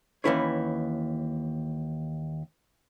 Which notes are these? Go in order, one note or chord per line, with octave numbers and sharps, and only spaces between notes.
D#2 E3 C#4 E4 B4 C#5